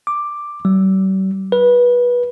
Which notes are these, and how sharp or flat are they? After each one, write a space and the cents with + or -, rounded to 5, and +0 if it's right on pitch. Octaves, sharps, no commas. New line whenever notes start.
D6 +5
G3 -45
B4 -20